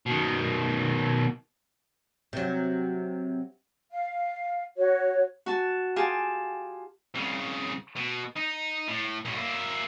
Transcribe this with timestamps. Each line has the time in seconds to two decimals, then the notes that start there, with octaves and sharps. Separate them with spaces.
0.06 B2 D#3
2.33 C3 F#3
3.91 F5
4.77 F#4 C#5
5.46 F#4 A5
5.96 F4 G4 G#4 G#5 A5
7.15 C2 C#3
7.96 B2
8.36 D#4
8.88 A2
9.25 B1 A2
9.37 A#3 E4